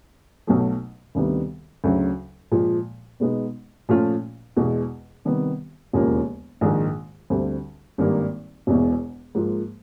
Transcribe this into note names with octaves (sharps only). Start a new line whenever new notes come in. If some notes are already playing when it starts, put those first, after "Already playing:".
B1 B2 F#3 A3
D2 C3 D#3 G3 B3
D2 C#3 F#3
A#2 F3 G#3
B2 G#3 B3 D#4
A#2 F3 A3 C#4 F4
E2 B2 G#3
C3 D#3 G3 B3
E1 D#2 C#3 F3 A#3
A#1 G#2 D#3 G#3
D2 D3 G3 C4
G#1 G2 D#3 G3 A#3
E1 E2 B2
G#2 F3 A#3